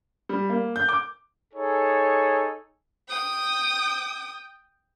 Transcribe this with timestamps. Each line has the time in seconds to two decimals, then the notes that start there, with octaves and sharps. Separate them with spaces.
0.29 G3
0.49 A#3
0.76 G6
0.89 D6
1.53 D#4 G#4 A4 C#5
3.08 G5 D#6